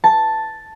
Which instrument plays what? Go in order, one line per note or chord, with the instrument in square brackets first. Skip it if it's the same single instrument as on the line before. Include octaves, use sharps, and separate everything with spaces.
[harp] A5